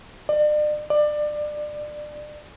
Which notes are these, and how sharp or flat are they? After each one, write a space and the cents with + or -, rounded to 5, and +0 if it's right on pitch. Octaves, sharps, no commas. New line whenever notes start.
D5 +40
D5 +25